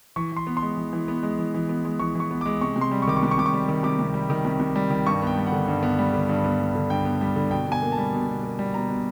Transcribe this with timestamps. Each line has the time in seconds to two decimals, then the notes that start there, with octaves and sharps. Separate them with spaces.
0.16 E3 C#6
0.32 E3 C6
0.47 B3
0.57 C6
0.62 G#3
0.77 E3
0.93 E3
1.08 B3
1.23 G#3
1.38 E3
1.54 E3
1.69 B3
1.85 G#3
1.99 E3 C#6
2.15 E3
2.20 C#6
2.31 B3
2.41 G#3 D6
2.61 C3 C#6
2.76 C3
2.81 C6
2.91 G3
3.02 C#6
3.08 D#3 D6
3.17 C#6
3.23 C3 D6
3.31 C#6
3.38 C3 D6
3.46 C#6
3.53 G3
3.69 D#3
3.83 C3 D6
3.99 C3
4.14 G3
4.30 D#3
4.45 C3
4.60 C3
4.76 G3
4.90 D#3
5.06 G2 C#6
5.22 B3 G5
5.37 G3
5.47 F#5
5.52 D3
5.68 G2
5.83 B3
5.99 G3
6.13 D3
6.29 G2
6.44 B3
6.60 G3
6.75 D3
6.90 G2 G5
7.05 B3
7.21 G3
7.36 D3
7.51 B2 G5
7.67 B2 G#5
7.82 A#3
7.92 A5
7.98 G3
8.13 B2
8.29 B2
8.43 A#3
8.59 G3
8.74 B2 A#5
8.89 B2